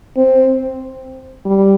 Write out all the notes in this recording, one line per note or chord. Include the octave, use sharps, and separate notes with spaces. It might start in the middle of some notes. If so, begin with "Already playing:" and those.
C4
G3